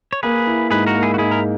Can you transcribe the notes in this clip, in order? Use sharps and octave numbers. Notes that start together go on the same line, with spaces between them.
C#5
A#3 G#4 B4
E4
G#2 G#4 B4
F#4 A#4
A#3
E4 G#4
F#4
G#2 E4 G#4
A#4